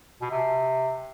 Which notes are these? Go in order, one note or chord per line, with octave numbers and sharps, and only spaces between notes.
B2
C3